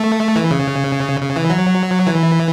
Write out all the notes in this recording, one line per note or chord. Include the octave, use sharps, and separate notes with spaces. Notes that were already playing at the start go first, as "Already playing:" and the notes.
Already playing: A3
E3
C#3
C#3
E3
F#3
E3